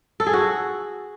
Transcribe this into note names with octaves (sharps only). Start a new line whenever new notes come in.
A4
G#4
F#4